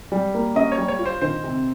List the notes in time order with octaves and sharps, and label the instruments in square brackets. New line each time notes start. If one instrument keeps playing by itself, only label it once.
[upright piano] G3
A#3
[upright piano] C#4 [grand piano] D#5
[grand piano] C#5
[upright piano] G3
[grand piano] C#5
[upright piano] F4
[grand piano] C5
[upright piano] D#3 [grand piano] C5
[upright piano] C3